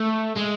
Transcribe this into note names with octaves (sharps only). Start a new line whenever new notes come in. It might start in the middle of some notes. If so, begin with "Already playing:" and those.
Already playing: A3
G#3